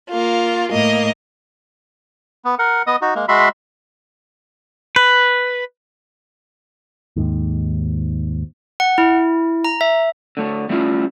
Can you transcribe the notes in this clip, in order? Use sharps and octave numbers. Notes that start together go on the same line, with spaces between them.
A#3 F4
A2 A#3 D#5
B3
A#4 F#5
B3 D#5 D#6
D#4 F#4
G#3 A#3
G#3 F#4 E5 B5 C6
B4
D#2 G#2
F#5
E4
A#5
E5
D3 A3 C#5
G3 A3 C#4 D4 E4 F4